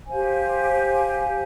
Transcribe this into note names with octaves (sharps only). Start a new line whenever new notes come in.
G4 C5 F5 G#5